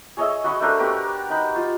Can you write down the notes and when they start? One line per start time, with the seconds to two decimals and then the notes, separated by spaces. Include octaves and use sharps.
0.17 G#4 C#5 D#5 E5
0.44 F#4 D#5 B5 C#6
0.60 A3 D4 A#4 C5
0.79 F#4 G4 A#4 B4
1.30 D#4 B5
1.55 F4